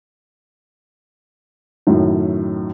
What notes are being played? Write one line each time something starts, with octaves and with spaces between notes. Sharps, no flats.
F#2 A2 D#3